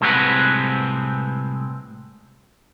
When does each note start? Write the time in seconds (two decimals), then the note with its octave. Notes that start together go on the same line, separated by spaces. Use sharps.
0.01 C2 A2 G#3 C4 B4 F#5